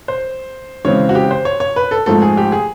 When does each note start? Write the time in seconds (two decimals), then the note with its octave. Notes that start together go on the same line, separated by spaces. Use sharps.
0.08 C5
0.85 C#3 E3 G#3 C4 C#5
1.09 F#4
1.15 G4
1.31 C5
1.45 C#5
1.60 C#5
1.76 B4
1.91 A4
2.06 G#2 F3 A3 C4 A4
2.22 G#4
2.37 G4
2.52 G#4